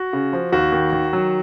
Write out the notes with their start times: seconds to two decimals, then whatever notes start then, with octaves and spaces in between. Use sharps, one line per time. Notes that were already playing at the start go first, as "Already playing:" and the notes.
Already playing: F#4
0.13 C#3
0.33 F3
0.52 D#2 F#4
0.72 D#3
0.93 D#3
1.13 F#3